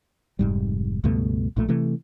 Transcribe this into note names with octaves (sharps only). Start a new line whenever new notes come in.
F1 G#2 G3
C#2 G2 B2 A3
A#1 A#2 A3
C3 E3 A3